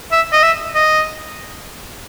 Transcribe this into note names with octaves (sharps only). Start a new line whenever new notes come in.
E5
D#5
E5
D#5